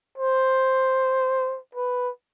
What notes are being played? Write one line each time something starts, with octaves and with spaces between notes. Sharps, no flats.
C5
B4